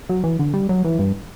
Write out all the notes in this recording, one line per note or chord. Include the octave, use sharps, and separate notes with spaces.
F#3
E3
D3
G3
F#3
E3
G2